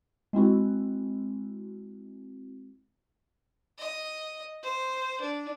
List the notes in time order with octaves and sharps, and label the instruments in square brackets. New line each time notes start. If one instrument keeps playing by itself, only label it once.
[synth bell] G#3 C4 E4 F#4
[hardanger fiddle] D#5
C5
D4